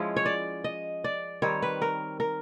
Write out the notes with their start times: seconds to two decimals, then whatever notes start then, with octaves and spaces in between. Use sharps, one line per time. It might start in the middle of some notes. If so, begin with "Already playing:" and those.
Already playing: F3 G#3 C#4 E4
0.17 C#5
0.26 D5
0.64 D#5
1.04 D5
1.42 D#3 G3 C4 C#5
1.62 B4
1.82 A#4
2.20 A#4